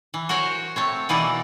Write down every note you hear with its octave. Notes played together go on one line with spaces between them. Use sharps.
E3
F#4 A#4 C5 C#5
A3 C4 C#5
B2 E3 A#3 D#4 E4 D5